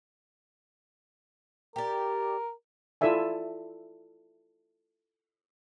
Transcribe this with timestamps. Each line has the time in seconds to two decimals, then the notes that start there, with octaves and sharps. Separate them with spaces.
1.76 G4 A#4 D5
3.01 E4 F4 A4 D5 E5 G#5